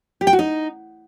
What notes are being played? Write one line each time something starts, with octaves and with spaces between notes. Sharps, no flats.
G4
G5
F#4
D#4